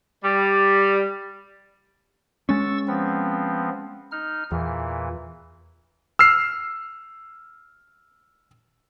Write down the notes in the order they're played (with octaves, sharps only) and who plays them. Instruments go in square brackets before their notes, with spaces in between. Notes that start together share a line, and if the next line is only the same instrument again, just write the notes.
[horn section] G3
[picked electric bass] G#3 C#4 [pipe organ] C#6 E6 A6
[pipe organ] F3 B3 C4
D#4 F6
[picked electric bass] E2 [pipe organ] A#2 E3
[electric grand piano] E6 F6 C7